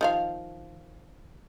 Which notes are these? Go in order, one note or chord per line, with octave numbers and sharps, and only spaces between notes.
D#3 F3 F5